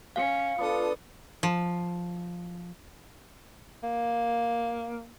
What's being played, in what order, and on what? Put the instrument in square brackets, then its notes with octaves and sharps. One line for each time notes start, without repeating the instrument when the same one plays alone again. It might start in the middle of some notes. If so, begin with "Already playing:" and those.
[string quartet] C#4 [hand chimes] F5 C#7
[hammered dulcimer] B3 D4 [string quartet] F4 A4 D#6
[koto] F3
[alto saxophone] A#3